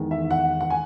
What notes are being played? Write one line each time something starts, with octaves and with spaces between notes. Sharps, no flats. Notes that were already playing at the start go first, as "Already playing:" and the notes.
Already playing: E2 D#3 G#3
E5
F#5
F#5
G#5